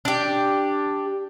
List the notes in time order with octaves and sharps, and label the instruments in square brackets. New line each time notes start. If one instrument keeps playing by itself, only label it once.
[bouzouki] D4 G4